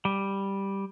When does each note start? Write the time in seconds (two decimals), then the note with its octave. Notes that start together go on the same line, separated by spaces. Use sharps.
0.05 G3